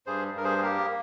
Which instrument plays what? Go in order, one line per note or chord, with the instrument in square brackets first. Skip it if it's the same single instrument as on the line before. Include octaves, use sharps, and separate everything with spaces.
[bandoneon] G2 G#4 C5
G2 A#4
G#4 C5
G#4
A#3 G4 A#4